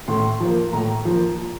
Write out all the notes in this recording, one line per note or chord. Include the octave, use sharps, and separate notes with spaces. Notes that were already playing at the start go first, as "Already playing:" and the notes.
A2 C6
F3 A#3
A2 A#5
F3 A#3